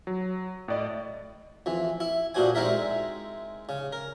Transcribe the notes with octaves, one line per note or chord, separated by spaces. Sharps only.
F#3
A2 E4 D5 D#5
F2 E3
E4
G2 A#2 D4 F#4 C5 G#5
G#3 C4 D#4 E4 A#4 E5
C#3
A#4